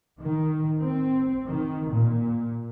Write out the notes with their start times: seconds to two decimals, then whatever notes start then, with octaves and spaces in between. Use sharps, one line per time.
0.21 D#3
0.79 C4
1.46 D#3
1.92 A#2